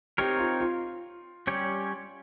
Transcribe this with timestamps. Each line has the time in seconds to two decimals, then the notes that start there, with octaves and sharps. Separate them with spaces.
0.18 C4 D#4 G4 A#4 C#5
0.39 F4
0.61 F4
1.47 G3 C#4 G4 C#5